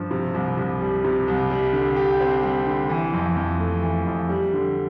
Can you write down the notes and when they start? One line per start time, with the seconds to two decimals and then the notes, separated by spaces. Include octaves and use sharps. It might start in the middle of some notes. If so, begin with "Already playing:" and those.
Already playing: G2 F3
0.11 C3
0.34 C2
0.57 C2
0.81 G3
1.04 C3
1.28 C2
1.50 G3
1.73 D3
1.96 G4
2.20 C4
2.43 G3
2.67 D3
2.89 E3
3.13 F2
3.36 F2
3.60 A3
3.82 E3
4.06 F2
4.29 G3
4.53 D3